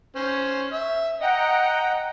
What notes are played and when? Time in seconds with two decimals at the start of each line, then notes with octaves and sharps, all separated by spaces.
0.16 C#4 C5
0.72 E5
1.22 D#5 F#5 G5 A#5